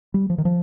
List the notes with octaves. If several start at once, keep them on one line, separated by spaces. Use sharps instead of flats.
G3
F3
D#3
F3